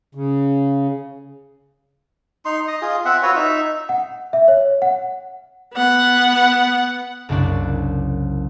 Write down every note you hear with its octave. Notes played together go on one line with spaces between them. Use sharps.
C#3
D#4 C6
D#5
F4 G#4
C4 E5 F#5
F4 F#4 B4 C#5
D#4 E5
F#5
E5
C#5
F#5
B3 F#5
F#1 C2 C#3 D4 D5 F#6